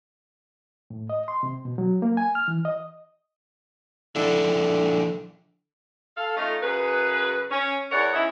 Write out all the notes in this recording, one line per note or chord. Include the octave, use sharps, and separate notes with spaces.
A2
D#5
C6
C3
B2
F#3
A#3
G#5
F6
E3
D#5
D3 F3 D4 E4
A4 F5
A3 C#4 D#4 F4
F#2 C#3 G#4 B4
C#4
E2 A#4 C#5 D5 F#5
C#4 D#4 E4